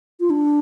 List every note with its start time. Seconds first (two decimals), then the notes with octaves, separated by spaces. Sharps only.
0.20 F4
0.30 D4